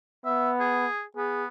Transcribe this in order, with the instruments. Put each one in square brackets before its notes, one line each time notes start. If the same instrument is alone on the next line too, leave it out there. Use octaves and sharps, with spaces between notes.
[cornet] B3 [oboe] E5
[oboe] G#4
[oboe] B3 [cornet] G#4